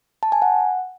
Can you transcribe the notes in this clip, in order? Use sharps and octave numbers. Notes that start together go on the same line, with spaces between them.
A5
G#5
F#5